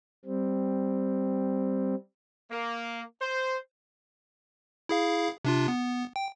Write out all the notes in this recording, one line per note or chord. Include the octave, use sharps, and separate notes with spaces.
G3 C4
A#3
C5
E4 G#4 F5
C3 D4 F4
B3
G5